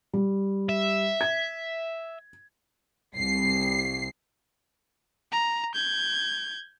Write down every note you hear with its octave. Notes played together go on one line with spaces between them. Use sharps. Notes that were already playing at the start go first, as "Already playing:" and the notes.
G3
E5
G#6
C2 C7
A#5
G6 G#6